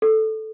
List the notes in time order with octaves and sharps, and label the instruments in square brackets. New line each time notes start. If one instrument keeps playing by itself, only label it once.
[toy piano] A4